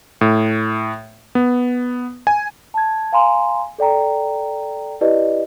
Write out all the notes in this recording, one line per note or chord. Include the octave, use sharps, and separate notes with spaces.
A2
B3
G#5
A5 G#6
F5 G#5 A#5 C6
A4 D5 G5 A#5
E4 G4 B4 D5 D#5